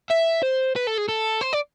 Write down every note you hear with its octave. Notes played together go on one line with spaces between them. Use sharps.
E5
C5
B4
A4
G#4
A4
C5
D5